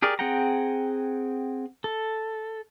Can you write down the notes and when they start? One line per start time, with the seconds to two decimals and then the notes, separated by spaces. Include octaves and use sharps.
0.02 G4 G#4 A#4 D5
0.19 C4 G#4 F#5 G5 A#5
1.84 A4